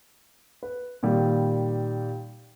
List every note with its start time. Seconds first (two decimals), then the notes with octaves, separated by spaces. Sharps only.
0.63 B4
1.03 A#2 D#3 G3